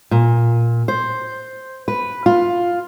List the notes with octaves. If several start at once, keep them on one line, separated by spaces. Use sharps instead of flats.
A#2
C5
B4
F4